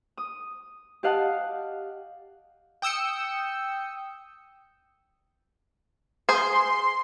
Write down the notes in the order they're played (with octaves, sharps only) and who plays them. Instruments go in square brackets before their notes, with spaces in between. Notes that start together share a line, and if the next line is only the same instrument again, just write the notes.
[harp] D#6
G4 D#5 F5 F#5 A5
[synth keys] G5 D#6 E6 G6 C#7
[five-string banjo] G#4 C5 [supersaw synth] C6